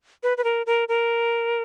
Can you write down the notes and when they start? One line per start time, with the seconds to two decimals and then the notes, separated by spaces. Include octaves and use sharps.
0.23 B4
0.37 B4
0.44 A#4
0.66 A#4
0.88 A#4